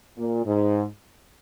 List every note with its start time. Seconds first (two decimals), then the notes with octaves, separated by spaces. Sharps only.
0.17 A#2
0.45 G#2